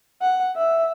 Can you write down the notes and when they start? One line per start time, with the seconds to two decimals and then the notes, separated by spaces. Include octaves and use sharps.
0.22 F#5
0.56 E5